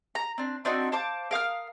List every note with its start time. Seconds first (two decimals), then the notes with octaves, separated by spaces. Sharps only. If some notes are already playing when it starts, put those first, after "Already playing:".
0.15 A#5
0.38 C4 D4
0.65 C4 D4 D#4 F#4
0.92 C5 F5 A5 D6
1.31 A#4 F5 D#6 F6